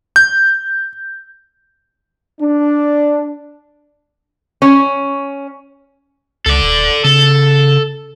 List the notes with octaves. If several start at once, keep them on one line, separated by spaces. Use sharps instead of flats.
G6
D4
C#4
C#2 A4 D5
D#1
C#3 A4